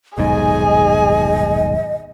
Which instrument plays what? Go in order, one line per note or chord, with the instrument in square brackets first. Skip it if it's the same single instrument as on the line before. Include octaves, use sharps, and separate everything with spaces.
[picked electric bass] D#1 B1 G#2 [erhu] G#4 [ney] D#5 [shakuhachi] G#5